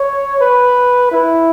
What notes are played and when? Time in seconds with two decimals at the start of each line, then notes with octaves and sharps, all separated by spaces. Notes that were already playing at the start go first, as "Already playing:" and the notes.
Already playing: C#5
0.41 B4
1.12 E4